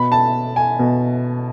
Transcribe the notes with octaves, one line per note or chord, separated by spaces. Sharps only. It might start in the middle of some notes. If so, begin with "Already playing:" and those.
Already playing: B2 B5
A5
G#5
B2